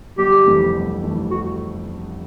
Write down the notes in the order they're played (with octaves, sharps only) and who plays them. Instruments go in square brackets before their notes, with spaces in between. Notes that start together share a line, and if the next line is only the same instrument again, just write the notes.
[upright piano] G1 [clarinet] G4
[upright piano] F2 C3 E3 A3
G1
F2 C3 E3 A3
[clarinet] F#4